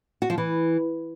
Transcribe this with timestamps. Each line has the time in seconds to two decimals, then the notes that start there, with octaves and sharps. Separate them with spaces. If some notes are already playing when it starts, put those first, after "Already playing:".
0.22 F#4
0.30 F3
0.38 E3